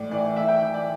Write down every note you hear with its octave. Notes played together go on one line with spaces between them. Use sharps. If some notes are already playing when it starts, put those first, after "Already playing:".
Already playing: A2 E3 D5
E3 D5
A2 E5
G5
E3
D5